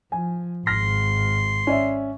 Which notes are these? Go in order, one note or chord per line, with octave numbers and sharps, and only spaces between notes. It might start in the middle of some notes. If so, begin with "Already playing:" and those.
F3 G#5
G#1 C6 F6 A#6 B6
C#4 D5 E5